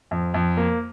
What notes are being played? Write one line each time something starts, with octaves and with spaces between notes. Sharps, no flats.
F2
F2
A#3